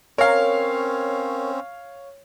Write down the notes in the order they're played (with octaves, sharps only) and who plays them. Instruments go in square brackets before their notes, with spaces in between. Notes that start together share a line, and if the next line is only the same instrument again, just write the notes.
[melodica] C4 C#4 [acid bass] A#4 [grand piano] C#5 F5